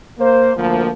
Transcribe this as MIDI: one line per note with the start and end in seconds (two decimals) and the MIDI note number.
0.19 0.53 58
0.19 0.53 72
0.57 0.90 38
0.57 0.90 53
0.57 0.90 58